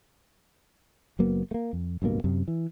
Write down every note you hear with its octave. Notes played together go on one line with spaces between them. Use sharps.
F#1 F#3 A#3 B3
A3 A#3
F2
D1 G2 B2 A#3
F#2 C3
E3